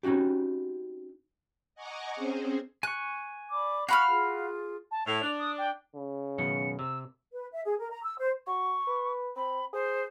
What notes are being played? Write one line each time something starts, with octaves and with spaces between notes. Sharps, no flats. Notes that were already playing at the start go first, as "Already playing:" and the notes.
C4 C#4 D#4 F#4 G4
D#5 F#5 G#5 A#5 C#6 D6
C4 C#4 G#4 C5
G#5 C#6 F#6
D5 B5 D6
F#4 F5 B5 C#6 F6
F4 G#4
A5
A2 F7
D4
D#6
G5
C#3
F#2 B2 D#3 C#7
C3 E6
B4
E5
G#4
A#4
A#5
E6
C5
F#4 C#6
B4
C4 B5
G#4 C5